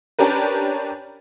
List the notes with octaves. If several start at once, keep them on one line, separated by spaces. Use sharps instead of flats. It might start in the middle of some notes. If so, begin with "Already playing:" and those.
C#4 D4 G4 A#4 B4